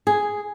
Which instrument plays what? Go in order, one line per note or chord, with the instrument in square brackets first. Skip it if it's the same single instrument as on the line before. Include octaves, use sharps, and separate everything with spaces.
[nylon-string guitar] G#4